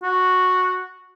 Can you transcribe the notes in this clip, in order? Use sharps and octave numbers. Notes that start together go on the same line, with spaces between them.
F#4